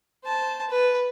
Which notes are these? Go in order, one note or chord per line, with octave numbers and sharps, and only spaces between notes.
C5 A5
B4